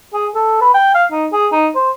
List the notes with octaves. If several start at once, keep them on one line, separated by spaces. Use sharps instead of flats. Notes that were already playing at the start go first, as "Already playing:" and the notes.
G#4
A4
B4
G5
F5
D#4
G#4
D#4
C5